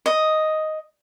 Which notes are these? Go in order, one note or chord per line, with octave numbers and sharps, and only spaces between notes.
D#5